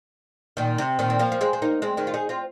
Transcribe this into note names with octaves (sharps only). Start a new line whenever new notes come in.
A#2 D#3
C3
A#2 D#3
C4
F3 A#3
A#3
G#3 C4
C4
A#3 D#4
G#3 C4
D#3 G#3
F4
D#4 G#4
C4 F4